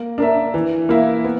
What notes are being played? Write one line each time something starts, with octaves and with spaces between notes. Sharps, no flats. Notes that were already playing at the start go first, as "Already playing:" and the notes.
Already playing: A#3
D4 A#4 E5
E3
A#3 E4
B3